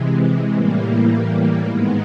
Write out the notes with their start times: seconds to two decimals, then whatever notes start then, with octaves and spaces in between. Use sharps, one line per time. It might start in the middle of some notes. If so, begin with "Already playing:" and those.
Already playing: C3 E3 G#3
0.53 A2 E3 G3 A#3
1.66 G#2 D#3 G#3 B3